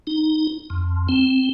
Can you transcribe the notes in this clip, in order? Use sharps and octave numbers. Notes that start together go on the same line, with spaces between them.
D#4
F2
C4